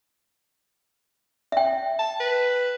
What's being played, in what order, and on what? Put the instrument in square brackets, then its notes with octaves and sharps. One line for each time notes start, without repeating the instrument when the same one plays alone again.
[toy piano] E5 G5
[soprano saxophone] A5
B4